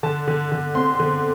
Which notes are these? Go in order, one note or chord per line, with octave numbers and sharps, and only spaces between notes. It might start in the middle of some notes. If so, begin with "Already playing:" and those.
D3 A5
D3
D3
C4 C6
D3